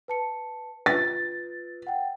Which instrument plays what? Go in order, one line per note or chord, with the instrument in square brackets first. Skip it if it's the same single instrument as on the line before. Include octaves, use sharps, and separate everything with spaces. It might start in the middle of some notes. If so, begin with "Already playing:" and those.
[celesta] B4 A5 C#7
[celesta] F4 B4 [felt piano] A6
[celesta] F#5 G5